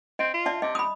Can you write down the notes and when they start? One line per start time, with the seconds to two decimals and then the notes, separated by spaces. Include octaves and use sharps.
0.19 C4 D#5
0.34 F4
0.46 D5 E5 A5
0.62 C3 D#5
0.75 B5 D#6